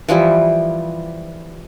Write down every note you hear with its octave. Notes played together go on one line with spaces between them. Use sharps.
E3 F3 G3 E4